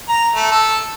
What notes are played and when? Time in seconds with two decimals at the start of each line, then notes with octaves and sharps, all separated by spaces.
0.09 A#5
0.35 A3
0.51 A4